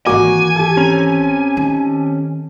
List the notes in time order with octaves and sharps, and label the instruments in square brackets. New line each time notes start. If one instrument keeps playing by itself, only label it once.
[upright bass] G#1 E3 [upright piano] A#3 F#4 D6 [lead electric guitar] G#5
[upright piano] G4 A4
[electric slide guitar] C4 C#4 A#5
[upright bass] D#3